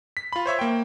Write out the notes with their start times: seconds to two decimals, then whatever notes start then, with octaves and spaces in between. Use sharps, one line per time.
0.17 B6
0.33 F4 B5
0.46 C5 C#5 E5 C#6
0.59 A#3 G5